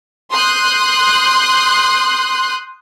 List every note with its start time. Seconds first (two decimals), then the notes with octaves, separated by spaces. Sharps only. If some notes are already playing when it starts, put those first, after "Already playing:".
0.31 C6 D#6 F#6 G6